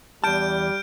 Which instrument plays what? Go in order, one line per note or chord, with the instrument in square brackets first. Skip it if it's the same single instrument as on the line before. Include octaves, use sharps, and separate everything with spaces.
[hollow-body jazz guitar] E2 A5 [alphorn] G3 [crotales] F6 G6 D7